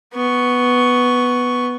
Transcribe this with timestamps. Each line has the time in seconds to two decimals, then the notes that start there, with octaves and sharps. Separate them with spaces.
0.14 B3 C#6